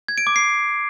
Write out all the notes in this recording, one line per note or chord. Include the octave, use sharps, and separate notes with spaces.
G#6
D7
D6
C7